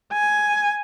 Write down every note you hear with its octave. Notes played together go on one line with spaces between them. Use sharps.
G#5